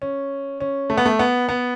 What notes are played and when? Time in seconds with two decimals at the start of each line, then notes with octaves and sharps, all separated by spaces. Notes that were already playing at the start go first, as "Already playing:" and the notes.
0.02 C#4
0.60 C#4
0.90 A3
0.97 B3
1.06 A3
1.19 B3
1.49 B3